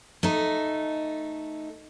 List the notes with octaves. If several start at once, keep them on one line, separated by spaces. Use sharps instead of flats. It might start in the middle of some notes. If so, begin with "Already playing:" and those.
A3 D#4